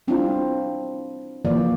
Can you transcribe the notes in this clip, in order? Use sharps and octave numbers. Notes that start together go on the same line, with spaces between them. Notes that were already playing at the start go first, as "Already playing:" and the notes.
G3 C4 D4 E4 F4
E3 F3 A#3 D5